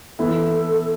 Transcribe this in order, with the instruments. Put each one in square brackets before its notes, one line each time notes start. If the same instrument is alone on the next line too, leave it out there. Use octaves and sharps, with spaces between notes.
[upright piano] E3 B3 E4 [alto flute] A4